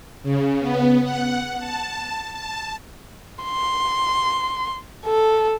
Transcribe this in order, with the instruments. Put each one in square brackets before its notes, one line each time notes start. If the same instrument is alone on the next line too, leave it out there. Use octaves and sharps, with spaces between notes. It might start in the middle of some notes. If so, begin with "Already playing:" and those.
[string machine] C#3
B3
F#5
A5
A5
[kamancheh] C6
A4